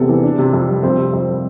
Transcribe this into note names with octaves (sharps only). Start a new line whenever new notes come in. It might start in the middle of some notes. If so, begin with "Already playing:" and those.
Already playing: E2 C3 A4
E3
D4
C3
F2
G3
F2 C5
C3
F2 C5
G3